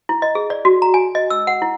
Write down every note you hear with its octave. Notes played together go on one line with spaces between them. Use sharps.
E4
D#5
G#4
D5
F#4
A#5
G#5
D#5
E6
F#5
E4